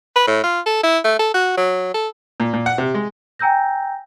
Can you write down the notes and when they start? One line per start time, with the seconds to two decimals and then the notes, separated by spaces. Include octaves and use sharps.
0.16 B4
0.27 A2
0.44 F4
0.66 A4
0.83 E4
1.04 A3
1.19 A4
1.34 F#4
1.57 F#3
1.94 A4
2.40 A#2
2.53 A#2
2.66 F#5
2.78 C3
2.94 G#3
3.39 G5 G#5 A#5 E6 G6 A#6